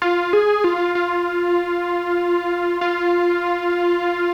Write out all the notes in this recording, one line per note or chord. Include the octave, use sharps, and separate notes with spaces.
F4
G#4
F4
F4
F4